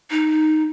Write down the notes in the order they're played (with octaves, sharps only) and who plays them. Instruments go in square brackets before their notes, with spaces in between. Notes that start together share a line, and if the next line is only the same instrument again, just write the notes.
[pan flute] D#4